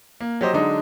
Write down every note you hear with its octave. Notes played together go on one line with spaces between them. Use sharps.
A#3
F#3 G4 C5 D#5
D3 F#3 G#3 D4 D#4